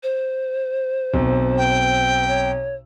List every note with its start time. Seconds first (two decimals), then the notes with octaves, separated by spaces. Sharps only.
0.03 C5
1.14 B1 C4
1.58 G5
2.27 C#5